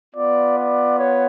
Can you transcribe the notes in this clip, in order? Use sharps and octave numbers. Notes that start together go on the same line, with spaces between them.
B3 F4 D5
D5
C#5